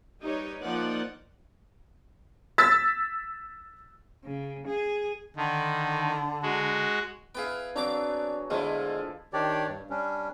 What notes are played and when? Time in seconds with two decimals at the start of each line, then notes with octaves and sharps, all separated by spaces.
0.21 G3 D#4 G4 B4 C#5
0.63 F3 A#3 D#4 D5 F#5
2.58 E6 A6 B6
4.25 C#3
4.67 G#4
5.37 D3 D#3
6.42 G#3 F#4
7.35 B3 E4 G#4 B4 F5 G5
7.76 F#3 C4 D4 A#5 D6
8.50 B2 D3 F3 G#3 A3 E4
9.33 D#3 D4 G4 C#5 D5
9.67 G2
9.90 G3 C#4 D4